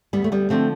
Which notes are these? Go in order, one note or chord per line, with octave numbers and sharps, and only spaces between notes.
D2 G3 B3
A3
G3 B3
D3 F3 A3 C4